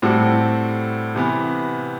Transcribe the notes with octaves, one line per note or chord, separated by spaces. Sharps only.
A2 G3 C4 F#4 A4
C3 E3 B3